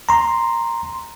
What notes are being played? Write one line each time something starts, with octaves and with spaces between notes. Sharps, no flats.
A#5 C6